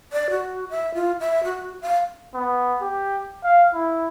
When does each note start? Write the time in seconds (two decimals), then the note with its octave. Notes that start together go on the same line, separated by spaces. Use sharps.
0.13 D5
0.30 F#4
0.70 E5
0.94 F4
1.20 E5
1.44 F#4
1.82 F5
2.34 B3
2.81 G4
3.44 F5
3.74 E4